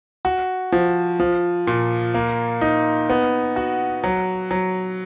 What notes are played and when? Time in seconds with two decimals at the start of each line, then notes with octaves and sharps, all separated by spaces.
0.25 F#4
0.72 F3
1.20 F3
1.67 A#2
2.14 A#3
2.61 D#4
3.10 B3
3.56 F#4
4.04 F#3
4.51 F#3